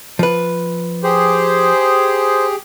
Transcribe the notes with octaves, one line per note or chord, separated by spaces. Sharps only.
F3 B4
G4 G#4 C5